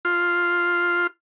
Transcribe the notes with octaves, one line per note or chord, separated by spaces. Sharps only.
F4